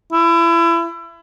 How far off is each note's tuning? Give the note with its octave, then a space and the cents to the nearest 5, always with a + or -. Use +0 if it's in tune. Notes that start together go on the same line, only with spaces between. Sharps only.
E4 +30